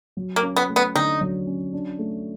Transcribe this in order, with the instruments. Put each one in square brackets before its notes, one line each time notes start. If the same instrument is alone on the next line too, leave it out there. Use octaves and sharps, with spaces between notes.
[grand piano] F#3
[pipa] A#3
[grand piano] C#4
[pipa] B3
[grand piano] A3
[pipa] B3
[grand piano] D3 [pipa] D#4
[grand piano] F#3
C#4
D4
A3